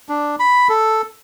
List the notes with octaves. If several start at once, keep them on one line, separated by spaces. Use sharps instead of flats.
D4
B5
A4